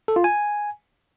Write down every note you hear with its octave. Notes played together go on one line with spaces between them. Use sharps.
A4
F4
G#5